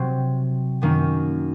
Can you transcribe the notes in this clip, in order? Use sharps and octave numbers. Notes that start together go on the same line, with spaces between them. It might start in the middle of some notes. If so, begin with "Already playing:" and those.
Already playing: C3 F#3 C4
F#2 D#3 A#3 C#4